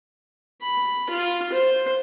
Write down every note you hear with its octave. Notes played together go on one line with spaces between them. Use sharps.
B5
F4
C5